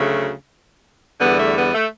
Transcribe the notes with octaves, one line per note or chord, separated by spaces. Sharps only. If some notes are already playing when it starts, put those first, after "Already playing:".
Already playing: D2 C#3 F#3 A3
E2 D3 G3 B3
A3
B3
A3